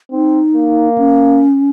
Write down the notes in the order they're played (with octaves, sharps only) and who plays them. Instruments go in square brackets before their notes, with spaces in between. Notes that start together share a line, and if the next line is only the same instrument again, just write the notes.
[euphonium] C4 [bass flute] D#4
[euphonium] A#3
[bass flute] C#4